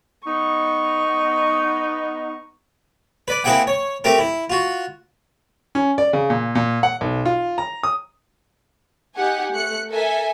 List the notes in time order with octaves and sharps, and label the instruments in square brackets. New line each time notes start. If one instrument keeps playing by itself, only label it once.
[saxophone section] B3 D#4 [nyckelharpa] C#6
[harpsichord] B4 D5
A#3 C4 E4 G#4 F#5 G5
C#5
A3 C4 G4 A#4
E4
F4 F#4
[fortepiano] C#4
D5
C#3
A#2
A#2
F#5
B1
F4
A#5
D#6
[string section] D#4 G4 F#5 G#5
A3 F#6 C#7
A4 A#4 E5 G#5